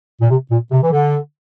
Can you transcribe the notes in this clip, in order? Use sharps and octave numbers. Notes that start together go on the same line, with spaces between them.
A#2
C3
A#2
C3
E3
D3